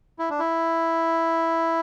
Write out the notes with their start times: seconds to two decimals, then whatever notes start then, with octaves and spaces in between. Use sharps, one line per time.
0.19 E4
0.30 D4
0.39 E4